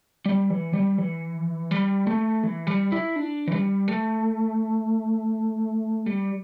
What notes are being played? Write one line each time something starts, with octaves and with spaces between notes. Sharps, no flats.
G3
E3
G3
E3
G3
A3
E3
G3
E4
D4
E3
G3
A3
G3